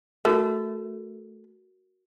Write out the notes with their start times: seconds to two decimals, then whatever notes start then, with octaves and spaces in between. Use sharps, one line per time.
0.25 A3 F#4 A#4